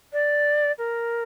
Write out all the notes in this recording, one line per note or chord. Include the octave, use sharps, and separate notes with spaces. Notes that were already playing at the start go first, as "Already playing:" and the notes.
D5
A#4